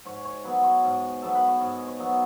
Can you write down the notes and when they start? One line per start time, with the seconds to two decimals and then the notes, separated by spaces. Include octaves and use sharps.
0.05 G#2 C#5
0.25 C#5
0.44 F#3 B3 B4
0.64 C#5
0.84 G#2
1.22 F#3 B3 A4
1.35 B4
1.48 C#5
1.61 G#2 D#5
1.87 C#5
2.00 F#3 B3